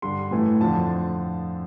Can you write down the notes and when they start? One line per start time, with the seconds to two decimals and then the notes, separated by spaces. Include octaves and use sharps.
0.02 G2 D3 G3 C6
0.31 A2 E3 A3 E4
0.61 F2 D3 F3 C4 A5